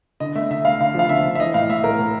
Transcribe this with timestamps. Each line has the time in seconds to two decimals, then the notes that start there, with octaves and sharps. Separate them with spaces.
0.20 D3 D#5
0.35 A3 E5
0.51 D3 E5
0.65 A3 F5
0.80 D3 F5
0.94 F3 F5
1.09 D3 E5
1.25 D3
1.35 E5
1.39 E3 D#5
1.54 A2 F5
1.69 A2 E5
1.84 A2 A#4
1.99 A2